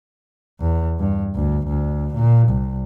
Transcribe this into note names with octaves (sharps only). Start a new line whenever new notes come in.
E2
G2
D2
D2
A#2
C2